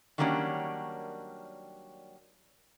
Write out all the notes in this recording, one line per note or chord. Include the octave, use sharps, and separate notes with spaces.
D#3 F#3 G3 A#3 C#4 D4